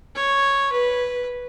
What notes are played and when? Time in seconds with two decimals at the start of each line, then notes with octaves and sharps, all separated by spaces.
0.15 C#5
0.72 B4